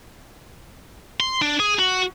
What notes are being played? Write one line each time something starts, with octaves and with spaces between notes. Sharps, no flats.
C6
D4
G#4
F#4